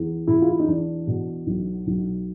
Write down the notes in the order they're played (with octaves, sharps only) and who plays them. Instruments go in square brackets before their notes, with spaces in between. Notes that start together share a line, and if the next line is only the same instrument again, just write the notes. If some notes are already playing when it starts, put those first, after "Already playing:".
Already playing: [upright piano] E2
B2 E4
F4
E4
D#4
E2 D4
B2
B1
B1